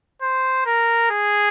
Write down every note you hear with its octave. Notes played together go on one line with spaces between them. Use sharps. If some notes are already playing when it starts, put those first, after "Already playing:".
C5
A#4
G#4